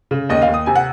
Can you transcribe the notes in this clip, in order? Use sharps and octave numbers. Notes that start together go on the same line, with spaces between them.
C#3
D#2 D#5
F5
D#2
D#6
C3 G#5
F#5